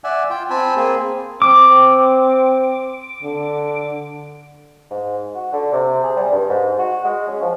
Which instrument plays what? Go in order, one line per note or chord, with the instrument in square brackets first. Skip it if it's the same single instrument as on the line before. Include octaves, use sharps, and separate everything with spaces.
[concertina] D5 E5 F#5 G#5
F4 G5
C4 G#5 A5 B5
A#3 C4 G#4
[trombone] C4 [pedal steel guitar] D6
[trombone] D3
[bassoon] G#2
F#4
D3
C3
G#4
G3
G2
G#2
F#4
G#3
C#4
F3